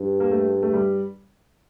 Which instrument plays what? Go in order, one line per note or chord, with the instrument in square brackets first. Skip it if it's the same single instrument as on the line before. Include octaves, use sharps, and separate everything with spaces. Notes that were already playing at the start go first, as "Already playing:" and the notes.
Already playing: [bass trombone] G2
[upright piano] A#3
A3
A3
G3